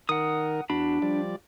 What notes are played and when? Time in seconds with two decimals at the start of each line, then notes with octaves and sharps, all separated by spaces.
0.09 D#3 A#4 F#5 D#6
0.70 E2 D4 F#4 B5
1.02 F3 G3 D5